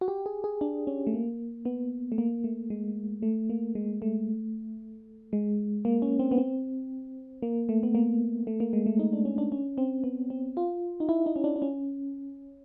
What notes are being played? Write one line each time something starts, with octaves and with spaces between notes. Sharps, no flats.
F#4
G4
G#4
G#4
D4
C#4
A3
A#3
B3
A3
A#3
A3
G#3
A3
A#3
G#3
A3
G#3
A#3
C#4
C4
B3
C4
A#3
A3
B3
A#3
A3
A#3
G#3
A3
D#4
D4
C#4
D4
C#4
C4
B3
C4
F4
D#4
E4
D#4
C#4
D4
D4
C#4